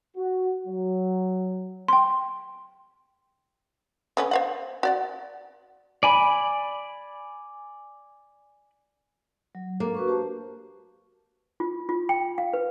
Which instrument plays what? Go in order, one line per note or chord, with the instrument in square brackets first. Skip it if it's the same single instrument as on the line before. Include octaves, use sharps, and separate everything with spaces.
[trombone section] F#4
F#3
[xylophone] G5 C6
[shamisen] D3 B3 C#4
C5 F5 F#5
F#4 D5 F#5
[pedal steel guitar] D5 G#5 B5
[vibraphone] F#3
[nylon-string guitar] A#3 [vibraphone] D4 A4
[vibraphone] F#4 B4 C#6
G4 C5 A5
[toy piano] F4
F4
G5
F5
B4